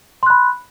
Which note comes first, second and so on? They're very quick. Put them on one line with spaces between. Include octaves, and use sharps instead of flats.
C6 F#6 B5